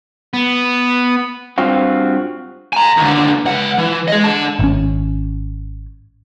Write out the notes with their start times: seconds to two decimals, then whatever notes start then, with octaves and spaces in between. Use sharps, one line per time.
0.34 B3
1.58 G2 C4 F4 F#4
2.73 G#5 A#5
2.97 D#2 D3
3.45 C#2 F#5
3.78 E3
4.08 G#4 D#5
4.24 D3 A5
4.59 G#1 C#4